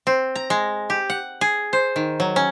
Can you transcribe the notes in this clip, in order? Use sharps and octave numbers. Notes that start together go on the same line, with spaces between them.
C4
A#5
G#3
G4
F#5
G#4
C5
D#3
F#3
C#4